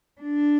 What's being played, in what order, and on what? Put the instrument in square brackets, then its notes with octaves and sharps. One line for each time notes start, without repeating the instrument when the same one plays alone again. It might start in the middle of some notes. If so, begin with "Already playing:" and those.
[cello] D4